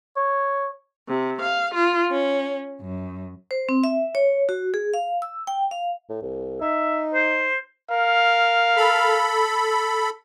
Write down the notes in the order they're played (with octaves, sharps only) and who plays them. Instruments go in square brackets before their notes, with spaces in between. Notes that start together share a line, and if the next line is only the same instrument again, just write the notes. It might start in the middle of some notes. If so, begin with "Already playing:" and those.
[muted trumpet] C#5
[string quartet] C3
F5
F4
C#4
F#2
[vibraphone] C5
C4
E5
C#5
F#4
G#4
F5
E6
G5
F5
[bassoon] A2
C2
[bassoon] D#4 [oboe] E5
[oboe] C5
[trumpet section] A#4 F5
[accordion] A4 B5